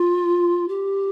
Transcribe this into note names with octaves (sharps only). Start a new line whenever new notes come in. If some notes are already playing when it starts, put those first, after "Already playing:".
Already playing: F4
G4